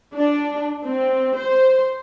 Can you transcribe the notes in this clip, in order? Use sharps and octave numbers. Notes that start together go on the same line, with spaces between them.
D4
C4
C5